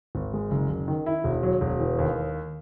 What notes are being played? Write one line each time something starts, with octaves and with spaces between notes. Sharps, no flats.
G#1
G#3
F#1
F#1
D#3
E4
E1
F#3
E1
E3
D#2